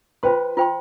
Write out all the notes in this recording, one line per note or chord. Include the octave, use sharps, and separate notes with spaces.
F4 B4 C5 G5 C6
F4 C5 G5 C6